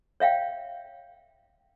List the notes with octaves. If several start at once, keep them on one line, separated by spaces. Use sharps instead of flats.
C#5 E5 F5 G5